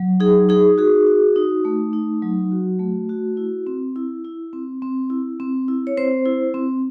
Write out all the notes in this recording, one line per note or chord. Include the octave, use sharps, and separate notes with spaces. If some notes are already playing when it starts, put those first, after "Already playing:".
Already playing: F#3
D#4 G#4
D#4 G#4
F#4 G#4
F#4
D#4
A3
D#4
F#3
F#4
A3
F#4
E4
C4
E4
E4
C4
C4
E4
C4
E4
C#5
C4 C5
E4
C4